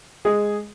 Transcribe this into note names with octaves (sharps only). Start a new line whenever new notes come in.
G#3 G#4